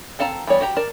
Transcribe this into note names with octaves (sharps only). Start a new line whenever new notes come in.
C4 A4 F5 A5 A#5
E3 G3 B3 C#5 D5
F#4 G4 A#5
A#4 D5 A5